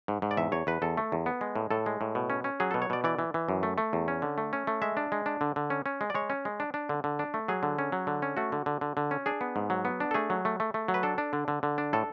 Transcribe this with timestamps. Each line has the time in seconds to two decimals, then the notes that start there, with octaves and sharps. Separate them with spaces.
0.08 G#2
0.22 G#2
0.31 D5
0.37 E2 E5
0.52 E2 C#5
0.67 E2 B4
0.82 E2 A4
0.97 A3
1.12 E2
1.26 B3
1.41 G#3
1.56 A2
1.71 A2 A4
1.86 G#3
2.01 A2
2.15 B2
2.30 C#4
2.44 C#4
2.60 F#3 G#4
2.71 B2 A4
2.82 C#5
2.90 B2 D5
3.04 E3 D5
3.19 E3
3.34 E3
3.49 F#2
3.63 A3
3.78 A3
3.93 E2
4.08 C#4
4.22 D3
4.38 A3
4.53 C#4
4.67 A3
4.82 G#3 E5
4.97 D4
5.12 G#3
5.26 D4
5.41 D3
5.56 D3
5.70 C#4
5.86 C#4
6.01 G#3
6.10 D5
6.15 G#3 C#5
6.30 C#4
6.45 G#3
6.60 D4
6.74 D4
6.89 D3
7.04 D3
7.19 D4
7.34 A3
7.48 F#3 G#4
7.63 D3
7.79 C#4
7.92 F#3
8.07 D3
8.22 C#4
8.37 A3 F#4
8.52 D3
8.66 D3
8.81 D3
8.97 D3
9.11 C#4
9.26 D4 G#4
9.41 B3
9.56 G#2
9.70 F#3
9.85 B3
10.00 D4
10.11 A4
10.14 A3 G#4
10.30 F#3
10.45 A3
10.60 A3
10.74 A3
10.88 F#3
10.94 B4
11.03 D4 A4
11.18 D4
11.33 D3
11.48 D3
11.63 D3
11.78 D4
11.93 A2 A4